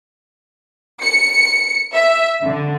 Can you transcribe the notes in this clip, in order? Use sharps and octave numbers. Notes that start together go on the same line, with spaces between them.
C#7
E5
D3